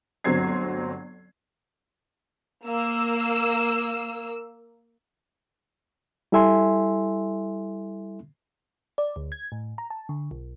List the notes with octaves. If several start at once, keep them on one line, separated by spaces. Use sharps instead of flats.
G1 D2 F#3 C4 G#6 C7
A#3 E6
G3 E4 A4 E5 G#5 C6
D5
D2
G#6
A2
A#5
A5
D3
B1